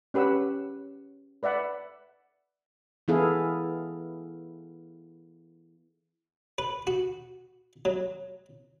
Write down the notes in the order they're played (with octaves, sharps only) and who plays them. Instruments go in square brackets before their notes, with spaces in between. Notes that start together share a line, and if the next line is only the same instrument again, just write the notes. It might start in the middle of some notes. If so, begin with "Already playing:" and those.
[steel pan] C#4 G4 B4 F#5 E6
B4 D5 E5 F#5 B5
[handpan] E3 B3 E4 G#4 A4 F5
[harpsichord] B4
F#4
F#3